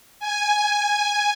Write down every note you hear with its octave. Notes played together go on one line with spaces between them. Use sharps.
G#5